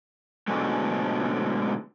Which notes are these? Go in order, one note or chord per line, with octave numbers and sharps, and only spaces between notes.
G#2 B2 D3 F#3 G#3 A3